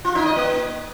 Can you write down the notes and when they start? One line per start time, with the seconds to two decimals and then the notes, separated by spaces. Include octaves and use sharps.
0.05 F4
0.15 D#4
0.26 D#5
0.36 A#3